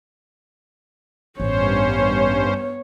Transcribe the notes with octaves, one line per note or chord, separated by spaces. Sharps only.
A1 G2 B3 C#4 C5 C#5